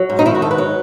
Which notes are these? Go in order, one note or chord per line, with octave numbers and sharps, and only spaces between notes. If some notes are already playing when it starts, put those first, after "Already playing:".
Already playing: F#3
G#2
D#4
D#3 E4
F#4
G#2 A4
B4
F#3